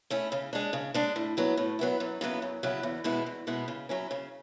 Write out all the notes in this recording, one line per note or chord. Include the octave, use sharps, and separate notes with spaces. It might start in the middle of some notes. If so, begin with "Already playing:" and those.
A3 C#4 E4
C#3
G#3 D4
C#3
G#3 D4
A2
F#3 B3 E4
A2
F#3 B3 E4
F#2
C#3 F#3 B3 E4
F#2
C#3 F#3 B3 E4
E2
B2 G#3 B3 E4
E2
B2 G#3 B3 E4
C#3
F#3 C#4 E4
C#3